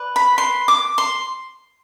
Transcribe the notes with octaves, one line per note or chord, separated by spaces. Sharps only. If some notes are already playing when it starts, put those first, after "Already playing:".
Already playing: B4 D5
B5
C6
D6
C6